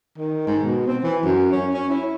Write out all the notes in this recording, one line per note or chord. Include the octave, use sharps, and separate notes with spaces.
D#3
G#2
B2
C4
E3
F#2
C#4
C#4
E4